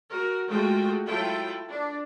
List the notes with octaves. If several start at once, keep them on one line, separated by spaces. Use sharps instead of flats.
F#4 A#4
G#3 A3 F4 F#4 G5
F#3 E4 F4 A4 G5
D4